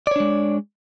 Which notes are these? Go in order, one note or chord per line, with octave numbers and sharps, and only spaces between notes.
G#3 D4 C#5 D5